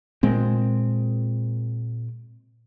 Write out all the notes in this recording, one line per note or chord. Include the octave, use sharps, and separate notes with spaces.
A#2 G#3 C4